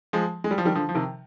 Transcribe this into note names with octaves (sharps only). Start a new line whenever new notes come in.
F3 G#3
G#3
G3
F3
D#3 G3
D3 F3
F3
C3 D#3